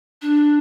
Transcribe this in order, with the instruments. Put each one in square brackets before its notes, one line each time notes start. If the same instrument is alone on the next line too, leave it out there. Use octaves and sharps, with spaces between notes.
[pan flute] D4